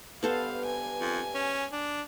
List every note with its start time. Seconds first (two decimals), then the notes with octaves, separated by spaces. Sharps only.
0.23 G2 B3 A4 C5 F5
0.65 G#5
0.99 F2
1.35 C#4
1.72 D4